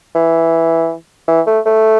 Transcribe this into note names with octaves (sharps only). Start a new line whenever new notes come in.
E3
E3
A3
A3